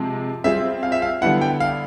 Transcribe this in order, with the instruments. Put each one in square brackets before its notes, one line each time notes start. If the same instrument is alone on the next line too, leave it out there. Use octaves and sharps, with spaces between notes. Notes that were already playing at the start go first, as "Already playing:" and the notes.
Already playing: [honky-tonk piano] C3 F3 G#3
[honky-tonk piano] G3 C4 F4 G#4 [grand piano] E5
[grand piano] F5
E5
F5
[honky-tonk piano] D3 G3 B3 E4 [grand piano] F#5
[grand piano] G5
F5